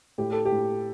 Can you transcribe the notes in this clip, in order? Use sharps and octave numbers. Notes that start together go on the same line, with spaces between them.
A2 G4
A4
G4
A2